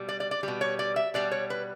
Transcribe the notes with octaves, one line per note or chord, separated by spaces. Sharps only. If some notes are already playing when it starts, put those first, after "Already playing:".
Already playing: B2 G3
D5
D5
D5
B2 G3
C#5
D5
E5
B2 G3 D5
C#5
B4